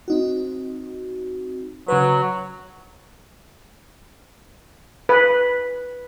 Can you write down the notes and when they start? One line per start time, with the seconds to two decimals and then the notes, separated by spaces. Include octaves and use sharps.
0.08 C4 D#4 F#4
1.88 C#3 F#3 B4
5.09 B4